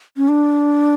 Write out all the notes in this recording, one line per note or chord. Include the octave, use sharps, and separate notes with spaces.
C#4
D4